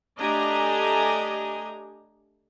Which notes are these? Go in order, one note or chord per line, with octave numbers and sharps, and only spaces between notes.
A3 D4 G4 D#5 G#5 A#5